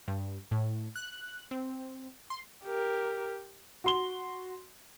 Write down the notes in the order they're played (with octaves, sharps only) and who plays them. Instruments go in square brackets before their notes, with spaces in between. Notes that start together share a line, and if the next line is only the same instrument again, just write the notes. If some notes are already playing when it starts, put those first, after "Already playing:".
[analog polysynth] G2
A2
F#6
C4
C6
[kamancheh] G4 A#4
[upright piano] F#4 C6 G7